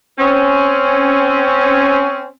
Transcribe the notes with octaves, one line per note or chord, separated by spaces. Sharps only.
C4 C#4